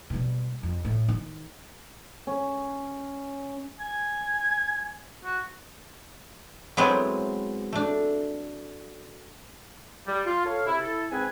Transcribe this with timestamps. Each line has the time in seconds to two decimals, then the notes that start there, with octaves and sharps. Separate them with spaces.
0.10 B2 G3
0.63 F2
0.85 A2
1.09 D#3
2.27 C#4
3.80 G#5
5.25 F#4
6.77 F#3 G#3 B3 C4 E4
7.73 A3 D4
10.07 G3
10.26 F4
10.44 A4 C#5 F5
10.66 C3 E4
10.80 E4 A4
11.11 G#2 C4 B4 G#5